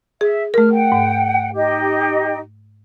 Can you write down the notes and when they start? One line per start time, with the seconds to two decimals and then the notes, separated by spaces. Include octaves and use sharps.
0.21 G#4 E5
0.54 A3 A#4 F6
0.71 F#5 G5
0.92 G#2
1.54 D#4 G4 D#5